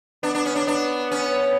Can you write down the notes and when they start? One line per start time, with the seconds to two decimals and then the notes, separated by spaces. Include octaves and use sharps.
0.23 B3 D4
0.35 D4
0.46 C#4
0.56 D4
0.67 B3 D4
1.11 C#4